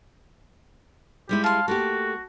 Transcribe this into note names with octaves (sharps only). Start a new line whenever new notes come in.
G3 G#3 E4 G4
F5 A5 C6
A3 A#3 F#4 G4